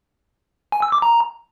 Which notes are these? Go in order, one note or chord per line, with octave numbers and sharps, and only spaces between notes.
G#5
E6
D6
A#5